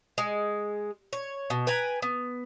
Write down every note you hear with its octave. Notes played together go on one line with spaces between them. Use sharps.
G#3
C#5
B2
B4 G5 G#5 A#5
B3